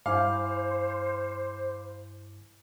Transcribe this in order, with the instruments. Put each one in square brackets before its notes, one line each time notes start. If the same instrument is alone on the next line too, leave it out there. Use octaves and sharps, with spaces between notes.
[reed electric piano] G2 E4 G#5 [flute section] C5 [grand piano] F5 [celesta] B5 D6